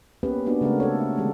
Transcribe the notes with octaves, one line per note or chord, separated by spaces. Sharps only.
A#3 B3 C#4 G4 B4
A#3 B3 D4 F#4 D5
C#3 G#3 A3 C4 A#4
A4 C#5
E5
D3 E3 G#3 C4 C#4 G4